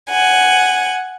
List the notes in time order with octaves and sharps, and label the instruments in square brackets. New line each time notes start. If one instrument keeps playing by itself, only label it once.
[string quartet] F#5 G#5